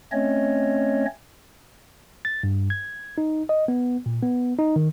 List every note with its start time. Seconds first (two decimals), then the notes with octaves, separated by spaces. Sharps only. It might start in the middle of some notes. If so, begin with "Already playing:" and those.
0.12 A3 C4 C#4 C#5 D#5
2.25 A6
2.43 G2
2.70 G#6
3.18 D#4
3.49 D#5
3.68 B3
4.06 A#2
4.23 B3
4.59 D#4
4.76 D#3